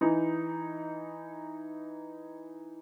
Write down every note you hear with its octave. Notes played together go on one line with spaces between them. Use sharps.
E3 D#4